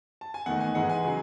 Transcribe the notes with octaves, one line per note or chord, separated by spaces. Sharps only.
A5
G#5
E2 D#3 A3 D#4 F#5
G#5
G#2 E3 G#3 D#4 F#5
G#5
C#3 F#3